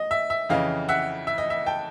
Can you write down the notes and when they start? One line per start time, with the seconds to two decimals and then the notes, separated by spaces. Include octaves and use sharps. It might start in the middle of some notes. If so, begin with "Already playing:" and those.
Already playing: D#5
0.11 E5
0.30 E5
0.50 F2 C#3 E3 D#5 F5
0.89 E5 F#5
1.27 E5
1.38 D#5
1.50 E5
1.66 G5 A5